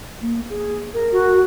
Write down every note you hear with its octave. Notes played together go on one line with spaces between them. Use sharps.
A#3
G#4
A#4
F#4